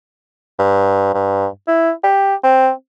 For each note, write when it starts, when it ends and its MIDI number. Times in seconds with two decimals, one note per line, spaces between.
0.59 1.11 43
1.14 1.46 43
1.68 1.91 64
2.03 2.35 67
2.43 2.70 60